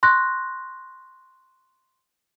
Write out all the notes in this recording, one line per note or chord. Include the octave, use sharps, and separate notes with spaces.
C6 C#6 F#6 A#6